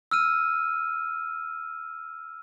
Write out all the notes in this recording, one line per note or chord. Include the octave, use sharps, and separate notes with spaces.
E6 F6 D#7